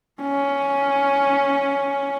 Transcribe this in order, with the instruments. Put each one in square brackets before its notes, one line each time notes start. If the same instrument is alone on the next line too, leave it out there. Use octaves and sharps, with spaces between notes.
[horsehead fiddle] C#4